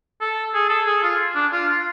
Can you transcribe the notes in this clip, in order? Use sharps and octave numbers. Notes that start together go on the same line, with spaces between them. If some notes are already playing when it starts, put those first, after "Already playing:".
A4
G#4
A4
G#4
F4
D4
F4
F4